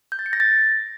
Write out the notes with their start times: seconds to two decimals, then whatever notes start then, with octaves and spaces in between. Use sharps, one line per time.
0.12 G6
0.19 A6
0.26 C#7
0.33 A#6
0.40 A6